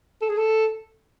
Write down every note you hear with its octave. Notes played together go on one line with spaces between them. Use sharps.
A4
G#4
A4